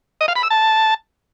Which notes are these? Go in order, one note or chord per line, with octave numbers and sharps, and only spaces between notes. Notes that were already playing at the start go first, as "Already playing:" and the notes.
D#5
F5
B5
E6
A5